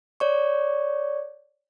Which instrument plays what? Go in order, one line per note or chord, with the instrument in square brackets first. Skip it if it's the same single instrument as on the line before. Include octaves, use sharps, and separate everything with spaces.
[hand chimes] C#5 D5 C#6